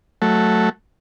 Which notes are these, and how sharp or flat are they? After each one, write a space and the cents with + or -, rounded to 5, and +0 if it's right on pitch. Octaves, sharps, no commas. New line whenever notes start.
F#3 +0 A3 +0